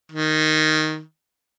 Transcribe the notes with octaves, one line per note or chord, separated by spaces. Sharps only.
D#3